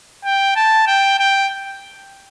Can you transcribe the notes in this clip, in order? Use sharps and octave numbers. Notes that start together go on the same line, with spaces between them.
G5
A5
G5
G5